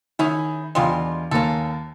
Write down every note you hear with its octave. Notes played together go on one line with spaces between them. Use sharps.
D#3 C#4 E4 G#4
E2 D3 G3 G#3 F4 C6
D#2 A#3 C#4 A4